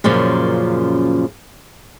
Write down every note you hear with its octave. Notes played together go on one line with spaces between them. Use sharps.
F#2 A#2 C#3 F3